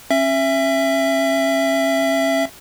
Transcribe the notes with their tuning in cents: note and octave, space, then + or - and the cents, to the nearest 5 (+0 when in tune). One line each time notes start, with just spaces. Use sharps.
C#4 -35 E5 +15